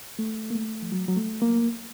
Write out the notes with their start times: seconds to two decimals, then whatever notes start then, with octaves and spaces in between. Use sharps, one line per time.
0.19 A3
0.50 A#3
0.55 A3
0.82 F3
0.92 F#3
1.08 F#3
1.17 A3
1.42 A#3